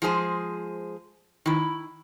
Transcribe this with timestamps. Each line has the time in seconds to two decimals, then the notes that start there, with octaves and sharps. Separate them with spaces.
0.02 F3 G#3 G#4 C5
1.46 D#3 E4